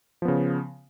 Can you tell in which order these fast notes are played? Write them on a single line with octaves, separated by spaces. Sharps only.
F3 B3 C#3